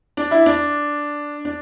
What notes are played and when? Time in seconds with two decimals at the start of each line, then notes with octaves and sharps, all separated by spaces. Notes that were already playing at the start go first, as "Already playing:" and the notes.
0.17 D4
0.31 E4
0.46 D4
1.45 D4